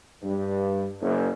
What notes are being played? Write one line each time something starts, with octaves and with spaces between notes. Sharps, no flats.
G2
F#1